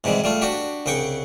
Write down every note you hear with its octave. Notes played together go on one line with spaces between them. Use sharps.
G#2 C3 E3 G3 G#3
G3 A3 F4
D4 F#4 G4
C2 C#3 F#5 G5 C#6